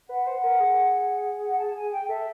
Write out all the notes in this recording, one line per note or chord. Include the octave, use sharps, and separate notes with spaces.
B4 F#5
C5
B4
A#4
G#4
F#5
A5
G#5
G5
A4 E5